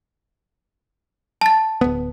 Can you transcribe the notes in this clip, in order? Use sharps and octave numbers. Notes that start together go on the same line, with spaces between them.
A5 A6
D1 B3